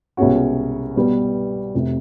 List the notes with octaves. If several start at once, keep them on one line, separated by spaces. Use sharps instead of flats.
C2 B2 G#3 C#4 F#4
B2 G3 B3
F1 C3